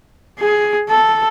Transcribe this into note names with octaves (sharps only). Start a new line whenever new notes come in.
G#4
A4